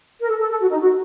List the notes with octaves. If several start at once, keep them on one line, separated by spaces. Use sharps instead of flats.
A#4
A4
A4
A4
F#4
D#4
F#4